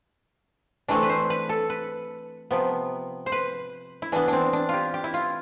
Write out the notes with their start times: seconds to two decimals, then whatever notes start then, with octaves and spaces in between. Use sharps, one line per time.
0.88 E3 A3 C4 D4
1.03 B4
1.09 C5
1.30 B4
1.49 A4
1.70 B4
2.51 C3 F3 B3
3.26 C5
3.32 B4
4.02 E4
4.12 E3 B3 D4
4.28 C4 D4
4.53 D4
4.69 F4 G4
4.94 G4
5.04 E4
5.14 F4